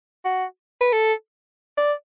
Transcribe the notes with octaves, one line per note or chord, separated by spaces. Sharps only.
F#4
B4
A4
D5